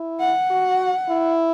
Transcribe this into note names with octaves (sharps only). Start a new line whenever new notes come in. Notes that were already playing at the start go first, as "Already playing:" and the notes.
Already playing: E4
F#5
F#4
E4